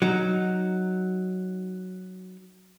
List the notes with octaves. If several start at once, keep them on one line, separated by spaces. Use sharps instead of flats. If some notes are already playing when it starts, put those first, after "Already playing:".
F#3 D#4